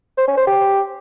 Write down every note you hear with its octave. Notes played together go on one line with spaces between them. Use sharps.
C5
C#4
C5
G4